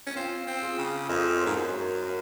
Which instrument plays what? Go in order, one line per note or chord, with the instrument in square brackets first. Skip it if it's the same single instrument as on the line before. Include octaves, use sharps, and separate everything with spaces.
[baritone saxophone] C#4
[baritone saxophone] C4 [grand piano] F4
[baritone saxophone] C4
[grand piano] F4 G#4
[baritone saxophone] C#3
[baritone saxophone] F2 [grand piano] C5 D#5
[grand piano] C5
[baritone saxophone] G#2 [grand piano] A#4 C#5
[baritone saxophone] F#2
[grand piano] A#4 C#5
F#4 A#4